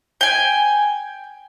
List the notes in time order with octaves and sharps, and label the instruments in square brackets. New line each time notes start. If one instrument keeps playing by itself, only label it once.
[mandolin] G5 G#5